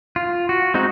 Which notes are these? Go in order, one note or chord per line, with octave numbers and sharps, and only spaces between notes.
F4
F#4
G#3 C4 D#4 F#4